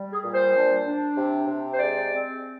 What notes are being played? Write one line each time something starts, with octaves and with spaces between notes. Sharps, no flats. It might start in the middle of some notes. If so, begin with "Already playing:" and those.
Already playing: G3
G#4
A#2
C5
D4
D4
C3
C3
C5
G#3 D5
C4